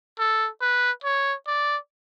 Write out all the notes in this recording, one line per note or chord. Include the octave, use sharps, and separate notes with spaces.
A4
B4
C#5
D5